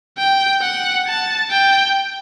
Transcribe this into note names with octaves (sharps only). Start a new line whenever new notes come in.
G5
F#5
A5
G5